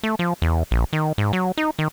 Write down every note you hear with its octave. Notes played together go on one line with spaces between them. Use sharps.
A3
F3
E2
A#1
D#3
G#2
F#3
D#4
D#3